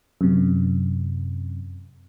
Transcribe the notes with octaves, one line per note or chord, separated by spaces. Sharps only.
F#2 C3